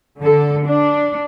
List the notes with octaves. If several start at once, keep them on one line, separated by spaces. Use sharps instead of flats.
D3 A4
D4